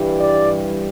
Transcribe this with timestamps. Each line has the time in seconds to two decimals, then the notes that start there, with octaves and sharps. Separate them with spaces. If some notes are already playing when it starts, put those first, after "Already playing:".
Already playing: G2 E3 G3
0.20 D5